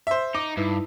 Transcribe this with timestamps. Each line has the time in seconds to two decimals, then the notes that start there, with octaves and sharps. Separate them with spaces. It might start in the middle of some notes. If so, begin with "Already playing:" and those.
0.07 C5 E5
0.35 D#4 D6
0.57 G2 D#4 E4 B4